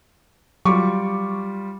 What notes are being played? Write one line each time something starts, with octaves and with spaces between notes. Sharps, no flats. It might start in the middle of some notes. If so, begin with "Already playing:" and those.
F#3 G3 F4 C#6 D6